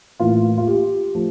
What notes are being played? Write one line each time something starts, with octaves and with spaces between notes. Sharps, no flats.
A2 E3 A#3 F4
F4
G4
F3 A3